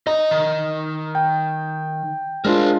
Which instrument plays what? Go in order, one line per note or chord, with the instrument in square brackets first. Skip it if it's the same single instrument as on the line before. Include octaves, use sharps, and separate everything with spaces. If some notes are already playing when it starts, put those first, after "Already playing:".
[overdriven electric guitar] D#4 A#5 [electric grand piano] D#5
[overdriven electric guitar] D#3
[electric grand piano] G5
[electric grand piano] G#3 D4 F4 [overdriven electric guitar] A#4 C5